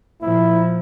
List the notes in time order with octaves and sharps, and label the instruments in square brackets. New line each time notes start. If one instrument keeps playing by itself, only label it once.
[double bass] A#2 F3 [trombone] E4